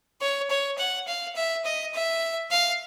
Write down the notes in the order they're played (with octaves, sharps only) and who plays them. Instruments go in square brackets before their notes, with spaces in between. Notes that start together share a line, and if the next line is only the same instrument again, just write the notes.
[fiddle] C#5
C#5
F#5
F5
E5
D#5
E5
F5